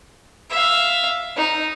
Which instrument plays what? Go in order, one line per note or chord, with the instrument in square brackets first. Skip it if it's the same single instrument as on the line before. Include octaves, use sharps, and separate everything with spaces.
[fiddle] E5 F5
D#4